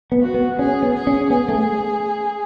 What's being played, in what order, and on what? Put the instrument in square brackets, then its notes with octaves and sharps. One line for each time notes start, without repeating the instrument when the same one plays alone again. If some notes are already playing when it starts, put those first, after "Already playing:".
[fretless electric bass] B3
[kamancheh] F#4
[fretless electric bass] B3
[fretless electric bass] C#4 [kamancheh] G#4
[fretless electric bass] B3
[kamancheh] G#4
[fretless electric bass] C#4
[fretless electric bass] B3 [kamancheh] G#4
[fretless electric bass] A3